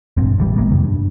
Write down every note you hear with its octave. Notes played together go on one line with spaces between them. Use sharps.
E1 A1 G2 C4
A1 E3 G3
A1 G#3 A#3 B3
F2 C3 D#3
G2